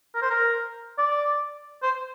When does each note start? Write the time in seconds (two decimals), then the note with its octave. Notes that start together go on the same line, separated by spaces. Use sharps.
0.15 A#4
0.22 C5
0.30 A#4
0.98 D5
1.83 C5